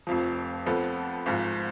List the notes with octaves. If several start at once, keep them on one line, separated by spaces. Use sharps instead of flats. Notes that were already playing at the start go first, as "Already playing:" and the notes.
F1 F2 F3
F2 F3 B3 F4 A4
G#1 G#2 F3